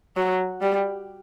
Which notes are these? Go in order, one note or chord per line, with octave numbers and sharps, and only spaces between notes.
F#3
G3